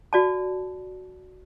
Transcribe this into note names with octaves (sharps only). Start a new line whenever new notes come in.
F#4 D5 A5